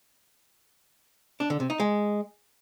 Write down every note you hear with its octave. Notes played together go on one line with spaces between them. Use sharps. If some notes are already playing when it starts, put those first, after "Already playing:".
D4
D3
C3
D#4
G#3